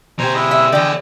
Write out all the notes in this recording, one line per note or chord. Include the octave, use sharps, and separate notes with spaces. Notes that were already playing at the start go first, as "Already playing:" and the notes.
B2 G4 C5 G#5 A#5
G#3 E4 D#5
E5
D3 E3 G#4 D5 D#5 G5